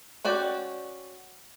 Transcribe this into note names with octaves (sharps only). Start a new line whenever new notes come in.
C#4 F#4 D5 G5